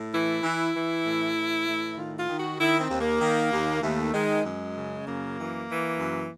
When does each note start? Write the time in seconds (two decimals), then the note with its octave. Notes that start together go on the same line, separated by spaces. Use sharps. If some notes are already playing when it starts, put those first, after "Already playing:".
Already playing: A2
0.13 E3 E4
0.43 E3
0.75 E3
1.05 A2
1.36 E3
1.67 A2
1.97 D#3 F4
2.18 F4
2.29 D#3
2.38 F#4
2.60 D#3 E4
2.79 C4
2.90 D#2
3.00 A#3
3.21 D#3
3.52 D#2
3.82 D#2 A3
4.14 D#3 G#3
4.45 F#2 G#3
4.76 C#3
5.06 F#2 A#3
5.37 E3
5.69 E3
5.99 F#2